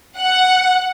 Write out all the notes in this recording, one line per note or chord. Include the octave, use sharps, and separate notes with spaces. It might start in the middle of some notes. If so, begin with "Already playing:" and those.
F#5